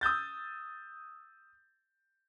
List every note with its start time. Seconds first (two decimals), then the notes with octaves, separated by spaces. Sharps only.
0.01 D#6 E6 G6 A6